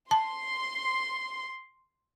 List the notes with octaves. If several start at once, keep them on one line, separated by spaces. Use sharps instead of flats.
A5 C6